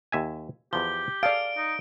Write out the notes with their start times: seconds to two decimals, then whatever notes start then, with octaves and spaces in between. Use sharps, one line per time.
0.12 D#2 E5 G#5
0.73 E2 F3 G4 G7
1.23 G#4 A4 D5 F5 D7
1.57 D#4